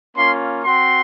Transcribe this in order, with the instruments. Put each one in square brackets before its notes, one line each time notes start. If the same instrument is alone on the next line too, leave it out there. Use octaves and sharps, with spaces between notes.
[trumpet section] A#3 C#4 F4 C6
C4 F#4 C6